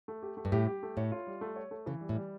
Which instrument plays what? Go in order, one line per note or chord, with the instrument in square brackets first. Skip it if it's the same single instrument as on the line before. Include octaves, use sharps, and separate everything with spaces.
[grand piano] A3
G4
A3
[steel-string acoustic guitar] G2
[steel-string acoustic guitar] A2 [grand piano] G4
[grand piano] G4
A3
[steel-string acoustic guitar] A2 [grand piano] C#5
[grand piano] F4
G3
A3
C#5
A3
[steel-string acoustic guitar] C#3 [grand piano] E3
[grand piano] G3
[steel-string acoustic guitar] A2
[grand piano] G3